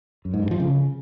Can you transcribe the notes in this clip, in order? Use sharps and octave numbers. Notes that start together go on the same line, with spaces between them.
F#2
G#2
G2
F3
C#3